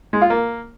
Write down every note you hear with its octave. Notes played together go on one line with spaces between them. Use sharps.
G#3
F4
A#3